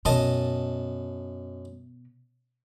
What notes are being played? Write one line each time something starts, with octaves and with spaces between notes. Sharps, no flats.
F#2 B2 D#5 A5